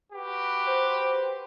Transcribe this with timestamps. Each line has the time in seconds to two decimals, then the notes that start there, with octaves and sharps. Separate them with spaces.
0.13 F#4 G4 B4
0.67 C5